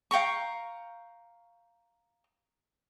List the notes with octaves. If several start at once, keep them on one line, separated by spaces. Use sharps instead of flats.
F5 G5 A#5 C#6